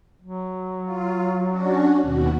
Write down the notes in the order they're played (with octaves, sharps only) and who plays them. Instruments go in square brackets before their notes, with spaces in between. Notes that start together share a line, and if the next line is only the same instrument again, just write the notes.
[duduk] F#3
[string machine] F4
C#4 D4 F#4
D#2 B2 F#4